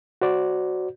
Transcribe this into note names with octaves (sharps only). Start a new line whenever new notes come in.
F#4 C5 D5